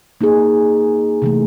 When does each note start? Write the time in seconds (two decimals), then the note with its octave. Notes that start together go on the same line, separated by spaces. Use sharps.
0.21 A#3 D#4 G#4
1.22 C3 E3 A3